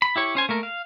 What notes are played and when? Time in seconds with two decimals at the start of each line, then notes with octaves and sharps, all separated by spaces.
0.02 B5
0.16 E4 G4 C#5
0.35 C#4 C5 G#5
0.49 A3 A#3 A#4
0.63 F5